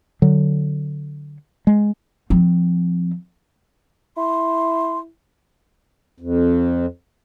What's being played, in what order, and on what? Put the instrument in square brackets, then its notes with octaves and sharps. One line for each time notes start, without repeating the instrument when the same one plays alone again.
[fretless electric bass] D3 F#3
G#3
[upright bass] F3 C4
[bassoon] E4 [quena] C6
[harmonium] F2